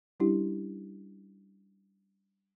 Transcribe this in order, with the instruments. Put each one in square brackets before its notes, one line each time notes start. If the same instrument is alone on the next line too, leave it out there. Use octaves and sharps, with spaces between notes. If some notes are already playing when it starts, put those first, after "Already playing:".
[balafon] G3 C#4 D4 E4 G4